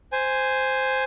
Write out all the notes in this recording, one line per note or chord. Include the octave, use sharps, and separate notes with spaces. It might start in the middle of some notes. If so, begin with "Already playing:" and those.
C5 G#5